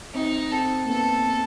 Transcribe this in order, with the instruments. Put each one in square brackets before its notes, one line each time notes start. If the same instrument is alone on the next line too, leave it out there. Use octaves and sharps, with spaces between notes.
[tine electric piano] C4 [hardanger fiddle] D#4
[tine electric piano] C4 [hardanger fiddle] A4
[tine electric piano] A#3
[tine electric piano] B3 [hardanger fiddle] A4